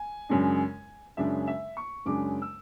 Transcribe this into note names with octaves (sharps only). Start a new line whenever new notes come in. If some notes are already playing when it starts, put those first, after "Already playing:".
Already playing: G#5
F#2 C#3 G#3 D4
F#2 C#3 G#3 D4 E5
E5
C#6
F#2 C#3 G#3 D4 D6
E6